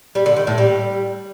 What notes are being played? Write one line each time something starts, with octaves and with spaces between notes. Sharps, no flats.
G3
D3
D#3
A2
G3